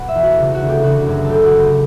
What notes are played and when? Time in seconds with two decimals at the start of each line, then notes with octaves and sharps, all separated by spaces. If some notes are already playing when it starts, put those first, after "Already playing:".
Already playing: B2 F#5
0.08 E5
0.15 E2
0.23 F#4
0.39 C#3
0.54 F#4
0.62 D2
0.69 G4
0.83 C#3 F#4
1.06 F#2
1.24 A4
1.29 C#3 G4
1.45 F#4
1.52 C#3
1.59 G4